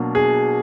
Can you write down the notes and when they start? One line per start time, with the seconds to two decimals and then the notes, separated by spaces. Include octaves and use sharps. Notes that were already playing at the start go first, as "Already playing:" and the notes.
Already playing: B2 F#3 A#3 D4
0.15 G#4